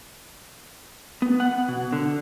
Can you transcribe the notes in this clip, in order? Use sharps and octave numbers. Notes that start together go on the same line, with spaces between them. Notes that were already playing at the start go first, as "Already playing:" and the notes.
B3
F#5
B2
D3